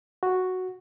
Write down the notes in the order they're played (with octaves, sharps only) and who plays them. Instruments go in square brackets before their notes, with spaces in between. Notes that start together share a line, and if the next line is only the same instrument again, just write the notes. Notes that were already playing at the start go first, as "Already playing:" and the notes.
[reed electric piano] F#4